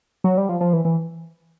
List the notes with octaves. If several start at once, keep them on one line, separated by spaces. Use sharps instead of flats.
F#3
G3
F3
F3
E3
E3